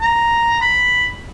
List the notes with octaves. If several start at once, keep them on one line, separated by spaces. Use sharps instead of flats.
A#5
B5